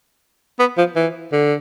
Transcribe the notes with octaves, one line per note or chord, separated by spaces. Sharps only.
B3
F3
E3
D3